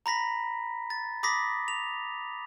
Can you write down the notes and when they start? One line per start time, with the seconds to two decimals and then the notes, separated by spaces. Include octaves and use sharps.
0.06 A#5 B5 A#6 B6
0.90 A6
1.23 B5 D6 D#6 A#6 B6
1.68 F7